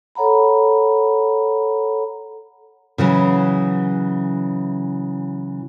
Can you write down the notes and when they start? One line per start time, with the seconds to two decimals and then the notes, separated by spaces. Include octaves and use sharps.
0.15 A4 C#5 F#5 A#5 B5
2.98 C#3 E3 F#3